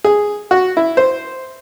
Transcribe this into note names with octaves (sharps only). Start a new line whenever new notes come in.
G#4
F#4
E4
C5